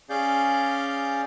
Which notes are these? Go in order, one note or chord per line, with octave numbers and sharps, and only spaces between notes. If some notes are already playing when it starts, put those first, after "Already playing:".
C#4 G#4 D5 F5 G6